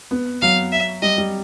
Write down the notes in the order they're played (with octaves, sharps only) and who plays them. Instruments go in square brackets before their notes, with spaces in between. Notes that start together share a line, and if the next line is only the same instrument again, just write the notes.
[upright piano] B3
[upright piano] F#3 [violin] F5
[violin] E5
[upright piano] G3 [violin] D#5
[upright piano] G3